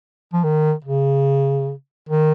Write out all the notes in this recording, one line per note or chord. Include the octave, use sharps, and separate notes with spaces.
F3
D#3
C#3
D#3